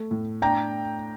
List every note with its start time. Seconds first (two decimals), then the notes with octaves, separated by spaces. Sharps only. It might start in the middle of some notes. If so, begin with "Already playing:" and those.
Already playing: A3
0.11 A2
0.42 D4 G5 A#5